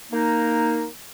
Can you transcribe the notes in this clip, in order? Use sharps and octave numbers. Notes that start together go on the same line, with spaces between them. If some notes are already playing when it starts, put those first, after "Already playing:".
A#3 D#4